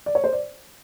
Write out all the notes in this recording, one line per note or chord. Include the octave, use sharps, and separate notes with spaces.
D5
C#5
C5
D5